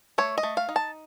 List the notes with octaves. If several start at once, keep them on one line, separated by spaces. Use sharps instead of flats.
A3 C#5
D#5
A3
F5
D#4
A5